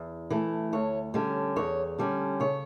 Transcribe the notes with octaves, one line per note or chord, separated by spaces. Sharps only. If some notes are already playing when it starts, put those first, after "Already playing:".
Already playing: E2
E3 A3
D2 C#5
D3 G3 C#4
E2 C#5
D3 G3 C#4
C#3 C#5